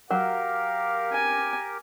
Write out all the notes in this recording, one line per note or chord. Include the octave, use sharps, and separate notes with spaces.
F#3 G4 A#4 F5
G#5